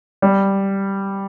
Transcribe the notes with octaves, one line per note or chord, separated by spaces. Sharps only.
G3